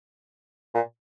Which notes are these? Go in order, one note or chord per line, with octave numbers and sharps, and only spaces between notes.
A#2